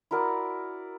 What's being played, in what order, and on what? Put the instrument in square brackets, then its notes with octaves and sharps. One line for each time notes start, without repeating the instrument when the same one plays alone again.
[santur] E4 F#4 A#4 D5